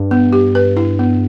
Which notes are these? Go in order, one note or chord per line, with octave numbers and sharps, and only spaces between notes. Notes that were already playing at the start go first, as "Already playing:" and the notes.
Already playing: G2
B3
G4
B4
E4
B3